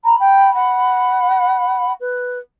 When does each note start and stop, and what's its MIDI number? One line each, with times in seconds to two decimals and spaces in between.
0.04 0.15 82
0.04 1.93 83
0.19 0.53 79
0.54 1.91 78
2.00 2.39 71